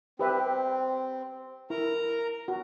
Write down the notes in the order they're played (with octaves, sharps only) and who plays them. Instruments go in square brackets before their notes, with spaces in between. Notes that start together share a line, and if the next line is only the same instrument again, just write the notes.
[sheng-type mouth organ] C4 [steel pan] G4 B4 E5
[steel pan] E4 [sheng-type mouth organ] A#4 A#5
[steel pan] F#4